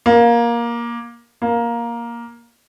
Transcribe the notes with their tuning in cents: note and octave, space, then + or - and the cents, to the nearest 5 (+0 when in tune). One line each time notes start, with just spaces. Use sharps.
A#3 +15
A#3 +10